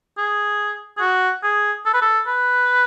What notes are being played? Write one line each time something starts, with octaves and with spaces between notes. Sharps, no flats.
G#4
G#4
F#4
G#4
A4
B4
A4
B4